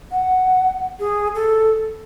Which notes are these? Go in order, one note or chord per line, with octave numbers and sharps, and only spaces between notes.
F#5
G#4
A4